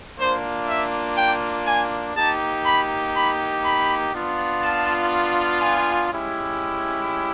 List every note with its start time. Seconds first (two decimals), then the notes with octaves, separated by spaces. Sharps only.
0.18 A#3 D4 F4 C5
0.68 E5
1.17 G5
1.67 G#5
2.16 A#3 D#4 G4 A5
2.65 B5
3.15 B5
3.64 B5
4.13 B3 D4 F4
4.62 A5
5.61 G#5
6.11 G#3 C#4 E4 G4